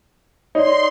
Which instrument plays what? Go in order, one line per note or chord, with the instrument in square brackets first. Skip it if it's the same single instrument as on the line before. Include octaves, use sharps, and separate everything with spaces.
[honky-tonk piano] D#4 [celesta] C#5 D5 [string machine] C6